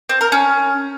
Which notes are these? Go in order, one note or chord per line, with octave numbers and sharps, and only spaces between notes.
C4
A#4
C#4